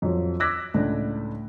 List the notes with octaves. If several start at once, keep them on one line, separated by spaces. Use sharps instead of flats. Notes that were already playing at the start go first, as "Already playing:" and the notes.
F2 F3 F#3
D6 E6 F#6 G#6 A#6 B6
C#2 A2 D4